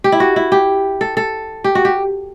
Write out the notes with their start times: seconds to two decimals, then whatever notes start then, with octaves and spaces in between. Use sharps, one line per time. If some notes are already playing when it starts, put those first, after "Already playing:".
0.04 G4
0.12 E4
0.20 F#4
0.36 E4
0.52 G4
1.01 A4
1.17 A4
1.64 G4
1.75 F#4
1.85 G4